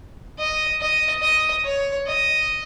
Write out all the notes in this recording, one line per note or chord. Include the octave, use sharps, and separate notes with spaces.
D#5
D#5
D#5
C#5
D#5